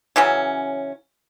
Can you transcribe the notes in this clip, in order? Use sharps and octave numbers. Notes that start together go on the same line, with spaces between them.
C#3 E3 F#3 C#4